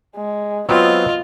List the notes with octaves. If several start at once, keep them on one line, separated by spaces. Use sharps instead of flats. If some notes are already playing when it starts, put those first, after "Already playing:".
G#3
F#3 B3 C4 F4 D#5